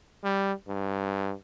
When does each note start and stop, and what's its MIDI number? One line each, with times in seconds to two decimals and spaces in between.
0.23 0.53 55
0.68 1.33 43